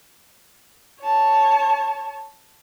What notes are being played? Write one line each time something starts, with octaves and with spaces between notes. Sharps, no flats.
C#5 A5